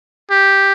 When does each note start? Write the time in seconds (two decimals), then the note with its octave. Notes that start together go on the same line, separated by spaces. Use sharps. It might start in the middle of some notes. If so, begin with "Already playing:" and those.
0.31 G4